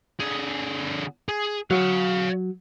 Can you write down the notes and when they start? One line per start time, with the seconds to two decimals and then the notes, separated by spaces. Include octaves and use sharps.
0.20 D3 G#4
1.29 G#4
1.71 F#3 C#5 F5